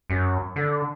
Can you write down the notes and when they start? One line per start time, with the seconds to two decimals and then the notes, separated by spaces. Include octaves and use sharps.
0.10 F#2
0.56 D3